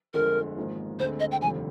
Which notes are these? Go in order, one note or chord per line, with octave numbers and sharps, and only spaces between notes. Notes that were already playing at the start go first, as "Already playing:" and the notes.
G1 F2 D3 G#3 A#4
G#1 G#2 F3 A#3
D2 D3 G#3 C4 C5
D#5
G5
F1 D#2 D3 G3 C4 G#5